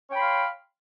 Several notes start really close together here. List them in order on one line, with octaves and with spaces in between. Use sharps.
C#5 G5 B5 C6 F5